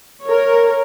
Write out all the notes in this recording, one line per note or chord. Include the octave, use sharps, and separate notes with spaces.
A#4 C#5